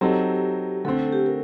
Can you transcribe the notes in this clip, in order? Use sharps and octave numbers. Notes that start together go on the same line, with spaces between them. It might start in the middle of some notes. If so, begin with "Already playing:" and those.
F#3 C4 D#4 G4 A4
D3 A3 C4 A4
A4
G4
A#4